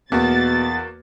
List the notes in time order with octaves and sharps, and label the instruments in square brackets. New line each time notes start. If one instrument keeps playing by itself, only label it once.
[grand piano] E2 [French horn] B2 [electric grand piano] A#3 F#4 [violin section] A6